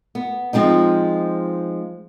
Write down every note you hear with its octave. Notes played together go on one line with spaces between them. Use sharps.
B3
F3 G#3 C4 D#4